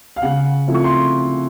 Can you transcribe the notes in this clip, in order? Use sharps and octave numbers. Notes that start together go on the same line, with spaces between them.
F5
C#3 F#5
F3 A3 C4 E4
C#6
C6